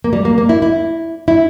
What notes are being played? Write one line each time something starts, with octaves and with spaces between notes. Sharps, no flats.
A#3
G3
A#3
A#3
E4
E4
E4